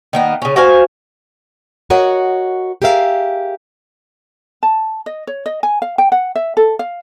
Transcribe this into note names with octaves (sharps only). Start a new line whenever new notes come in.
D#3 A#3 B3
C#3 C#4
F#4 C5 F5 G#5
F#4 A#4 C#5 D#5 F#5
G4 G#4 A#4 E5 F5
A5
D#5
C#5
D#5
G#5
F5
G5
F#5
E5
A4
F5